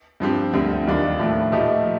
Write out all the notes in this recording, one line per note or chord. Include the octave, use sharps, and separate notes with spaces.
G2 F3 C4 G4
D2 D3 G3 C4
D#2 D#3 G3 D4 F4
A2 F3 A3
A#2 F3 A3 D#4 G4